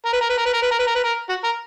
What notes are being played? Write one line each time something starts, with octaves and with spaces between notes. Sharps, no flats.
A#4
B4
A#4
B4
A#4
B4
A#4
B4
A#4
B4
A#4
B4
A#4
F#4
A#4